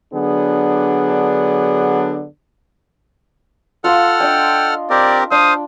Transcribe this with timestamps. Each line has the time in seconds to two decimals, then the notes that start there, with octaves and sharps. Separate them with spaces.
0.13 D3 F#3 B3 D4 G#4
3.84 F4 A4 F5 F#5 C6 F6
4.20 D4 D#5 G5
4.90 C4 G4 A#4 D5
5.31 D4 C5 F5 D#6